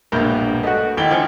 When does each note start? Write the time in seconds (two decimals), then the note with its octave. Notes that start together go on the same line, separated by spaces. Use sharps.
0.12 E1 A#1 G2 B3 A#4 G6
0.63 A3 F#4 D#5
0.97 G#1 E4 G5 G7
1.11 F3 C#4